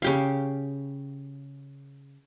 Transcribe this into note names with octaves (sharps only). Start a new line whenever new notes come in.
C#3 G4 F5